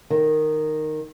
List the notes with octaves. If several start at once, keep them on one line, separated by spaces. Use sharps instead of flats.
D#3